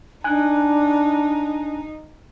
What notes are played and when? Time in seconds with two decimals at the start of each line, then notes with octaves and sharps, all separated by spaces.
0.24 D4 D#4 G#5 F#6